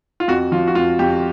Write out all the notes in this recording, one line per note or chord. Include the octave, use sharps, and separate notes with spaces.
F4
F2 F#4
F3 F4
F#4
F2 F4
F2 G4